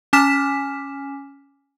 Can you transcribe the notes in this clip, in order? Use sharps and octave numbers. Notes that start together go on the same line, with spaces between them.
C#4 G#5 D6 F6 B6 E7